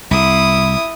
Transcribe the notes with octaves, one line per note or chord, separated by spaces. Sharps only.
C2 E4 D#6